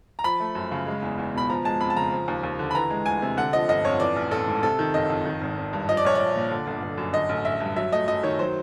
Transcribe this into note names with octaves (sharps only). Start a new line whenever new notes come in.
A#5
F3 B5
A3
F#2
C#3
G#3
E2
E2
B2 B5
F3 A#5
G#3 A5
F2 B5
A5
C#3 A#5
F3
D#2
D#2
D3
B5
E3 A#5
G#3
D2 G#5
C3
D3 F#5
F3 D#5
G1 D#5
F2 C#5
E3 D5
A1
A1 A4
G#2
C3 A4
D#3
F#1 D#5
F2
D#3
G#1
G#1
G2
F3 D#5
D5
A#1 C#5
A#1 D5
A#2
D3
G1
G1
F#2
D3 D#5
A1
A1 E5
G2
F#3 E5
A3 D#5
F#2 D#5
D#3 C#5
F#3 C5